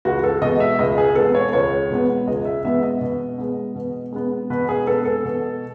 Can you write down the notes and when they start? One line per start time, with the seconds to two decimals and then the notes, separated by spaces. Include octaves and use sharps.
0.05 C#2 F#4
0.24 A4
0.41 B2 G#3 B3 D#5
0.60 E5
0.79 C#2 D#5
0.98 G#4
1.15 B2 G#3 B3 A4
1.35 C#5
1.53 C#2 C#5
1.90 B2 G#3 B3
2.27 C#2 D#5
2.45 E5
2.64 B2 G#3 B3 E5
2.83 D#5
3.01 B2
3.38 G#3 B3
3.75 B2
4.12 G#3 B3
4.50 B2 B4
4.69 G#4
4.87 G#3 B3 A4
5.05 A4
5.25 B2